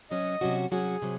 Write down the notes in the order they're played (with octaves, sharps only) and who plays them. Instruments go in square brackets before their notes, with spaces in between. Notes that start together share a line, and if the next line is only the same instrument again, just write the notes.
[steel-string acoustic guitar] C3 F#3 C#4 F#4 [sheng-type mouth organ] D#5
[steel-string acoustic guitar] C3 F#3 C#4 F#4
[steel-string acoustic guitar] C3 F#3 C#4 F#4 [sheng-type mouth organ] G#4
[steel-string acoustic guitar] C3 F#3